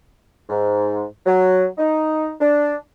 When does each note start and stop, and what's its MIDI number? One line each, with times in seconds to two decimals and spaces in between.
0.50 1.04 44
1.26 1.65 54
1.78 2.31 63
2.39 2.75 62